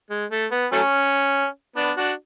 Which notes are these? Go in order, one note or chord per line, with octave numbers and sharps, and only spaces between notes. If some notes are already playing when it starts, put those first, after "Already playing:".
G#3
A3
B3
F#3 A3 C#4
B3 D4
D4 F#4